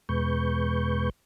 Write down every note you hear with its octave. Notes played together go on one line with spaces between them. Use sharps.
E2 B2 G#3 B4 C#6 G6